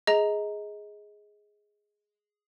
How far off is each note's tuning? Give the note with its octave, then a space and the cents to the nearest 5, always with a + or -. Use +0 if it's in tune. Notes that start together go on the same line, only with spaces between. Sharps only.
G#4 +0 D#5 +25 A#5 +0